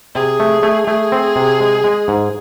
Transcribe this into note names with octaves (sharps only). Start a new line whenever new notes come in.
C3 G#4
A3
A3
A3 G#4
C4
C3
G#3
G#3
G#2